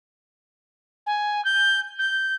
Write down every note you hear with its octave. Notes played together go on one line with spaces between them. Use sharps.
G#5
G6
G6